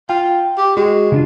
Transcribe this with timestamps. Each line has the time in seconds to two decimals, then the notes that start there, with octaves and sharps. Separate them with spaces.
0.09 F4 G5
0.58 G4
0.77 G#3 F#4
1.12 C#3 D4 F4